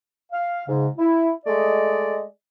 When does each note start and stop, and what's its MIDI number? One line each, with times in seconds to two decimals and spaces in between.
0.32 0.63 77
0.68 0.87 44
0.68 0.87 49
0.98 1.30 64
1.46 2.22 56
1.46 2.22 57
1.46 2.22 74
1.46 2.22 75